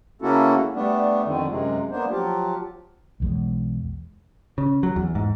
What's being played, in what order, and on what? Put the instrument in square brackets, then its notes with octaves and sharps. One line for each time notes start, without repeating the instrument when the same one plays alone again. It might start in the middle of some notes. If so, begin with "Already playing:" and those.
[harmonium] C#3 A#3 C#4 E4 F#4 A4
G3 A3 B3 D4
F2 D3 D#3
F#2 C3 G#3
A#3 B3 D4 C5
F3 F#3 F4 G4
[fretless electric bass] B1 E2 G#3
[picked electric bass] C#3
F#3
E2
G#2